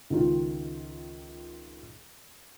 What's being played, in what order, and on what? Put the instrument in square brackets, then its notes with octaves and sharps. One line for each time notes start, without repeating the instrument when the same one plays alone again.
[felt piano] C#2 D#3 F4